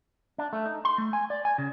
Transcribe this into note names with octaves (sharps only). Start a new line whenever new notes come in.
D4
A3
D#4
C6
A3
G#5
D5
G#5
C#3